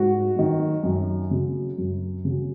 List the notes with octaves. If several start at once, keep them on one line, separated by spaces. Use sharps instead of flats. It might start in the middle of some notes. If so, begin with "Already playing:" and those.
Already playing: G#2 F#4
D#3 F#3
F#2
C#3 F#3
F#2
C#3 F#3